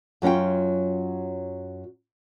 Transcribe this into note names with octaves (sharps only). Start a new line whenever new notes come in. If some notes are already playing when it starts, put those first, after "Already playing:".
F#2 F#3 C#4 F4 G5